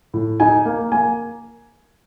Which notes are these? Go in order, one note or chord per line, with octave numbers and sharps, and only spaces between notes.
A2
D#4 G#5
A#3
A#3 G#5